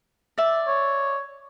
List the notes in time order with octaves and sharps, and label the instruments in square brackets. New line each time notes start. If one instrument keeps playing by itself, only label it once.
[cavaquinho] D5 E5
[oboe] C#5